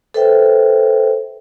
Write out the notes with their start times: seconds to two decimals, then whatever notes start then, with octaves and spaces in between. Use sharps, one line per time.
0.14 A4 B4 C5 E5 G5